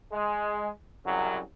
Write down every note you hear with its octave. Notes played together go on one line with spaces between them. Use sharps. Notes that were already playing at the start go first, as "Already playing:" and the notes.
G#3
C2 F#2 C#3 F#3